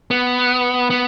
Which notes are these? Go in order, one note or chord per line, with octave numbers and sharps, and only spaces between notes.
B3
B3